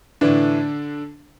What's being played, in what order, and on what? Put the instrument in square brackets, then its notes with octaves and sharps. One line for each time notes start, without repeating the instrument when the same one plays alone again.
[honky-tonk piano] A2 D3 E3 D4